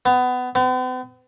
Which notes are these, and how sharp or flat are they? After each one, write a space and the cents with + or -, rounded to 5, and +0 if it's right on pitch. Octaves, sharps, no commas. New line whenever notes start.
B3 +20
B3 +45